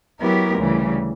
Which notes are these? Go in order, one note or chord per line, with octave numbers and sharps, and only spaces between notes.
F#3 B3 E4 G4 A#4
D2 C#3 E3 G3